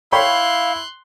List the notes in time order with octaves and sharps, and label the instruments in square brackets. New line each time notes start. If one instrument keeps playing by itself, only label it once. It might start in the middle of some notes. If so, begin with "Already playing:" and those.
[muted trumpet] E4 [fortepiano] C#5 G5 B5 [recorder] F5 [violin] C6 F#6